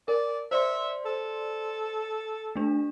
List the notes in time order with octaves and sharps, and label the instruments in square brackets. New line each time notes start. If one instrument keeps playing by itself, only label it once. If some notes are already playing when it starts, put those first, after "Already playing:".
[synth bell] A#4 [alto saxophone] D5
[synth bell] C5 D5 C6 [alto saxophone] E5
[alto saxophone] A4
[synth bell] A3 D4